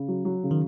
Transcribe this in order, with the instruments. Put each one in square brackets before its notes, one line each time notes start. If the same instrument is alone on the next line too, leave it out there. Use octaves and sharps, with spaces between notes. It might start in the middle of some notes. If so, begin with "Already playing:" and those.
Already playing: [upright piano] C#3
F#3
F#3
C#3
[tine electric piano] D#3